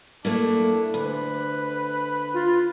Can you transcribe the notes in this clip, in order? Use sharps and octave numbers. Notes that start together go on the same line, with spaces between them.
A3 A#3 D4 E4
D2 B4
F4